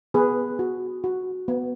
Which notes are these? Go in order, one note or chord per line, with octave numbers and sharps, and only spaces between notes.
B3 G#4 B4
F#4
F#4
B3